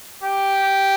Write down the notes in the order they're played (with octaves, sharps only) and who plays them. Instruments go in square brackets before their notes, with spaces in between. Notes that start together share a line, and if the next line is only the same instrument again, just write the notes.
[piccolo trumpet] G4